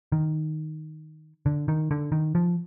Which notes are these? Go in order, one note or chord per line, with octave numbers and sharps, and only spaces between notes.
D#3
D3
D#3
D3
D#3
F3